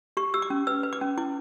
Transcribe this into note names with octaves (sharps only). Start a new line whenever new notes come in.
G4 C#6
G4 E6
D6
C#4
B4 E6
B4
D6
C#4
E4 D6